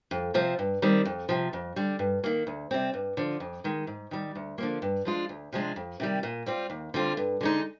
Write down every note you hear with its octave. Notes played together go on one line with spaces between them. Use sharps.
F2
C3 F3 C4
G2
D#3 G3 C4
F2
C3 F3
F2
D3 G3
G2
D#3 A#3
D2
C3 G3 C4
G2
D3 F3
F2
D#3 G#3
G#2
D#3 G3
D2
D3 F3 A#3
G2
F3 G#3 D4 F4
D2
C3 F3 G#3 D4
F2
C3 D#3 G3
A#2
G3 C4 F4
D#2
D3 G3 C4 F4
G2
D3 G#3 D#4